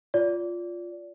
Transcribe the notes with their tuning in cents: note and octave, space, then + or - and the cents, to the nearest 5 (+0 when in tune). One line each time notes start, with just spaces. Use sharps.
F4 +0 D5 -25